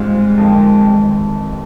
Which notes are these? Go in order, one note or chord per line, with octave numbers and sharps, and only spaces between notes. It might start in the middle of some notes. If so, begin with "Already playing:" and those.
Already playing: G#2 G3 G#3 C4 F4
F2 D3 F3 A#3 D#4
F1 F2 C3 D#3 G3